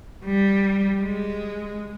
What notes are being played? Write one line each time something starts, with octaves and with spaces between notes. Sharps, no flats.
G3
G#3